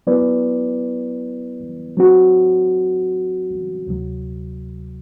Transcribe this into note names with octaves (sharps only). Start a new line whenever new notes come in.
F#3 B3 E4 B4 D5
F#3 C4 F#4
D2 C3 F#3